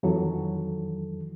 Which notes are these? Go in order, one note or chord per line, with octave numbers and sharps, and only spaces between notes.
F2 D#3 E3 F#3 A4